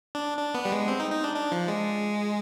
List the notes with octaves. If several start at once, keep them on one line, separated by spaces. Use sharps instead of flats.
D4
D4
B3
G3
G#3
C4
D#4
D#4
D4
D4
F3
G#3